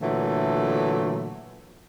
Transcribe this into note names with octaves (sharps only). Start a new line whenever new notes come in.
A#2 D3 E3 F#3 A3